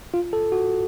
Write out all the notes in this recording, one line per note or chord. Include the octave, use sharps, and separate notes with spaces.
F4
A4
F#4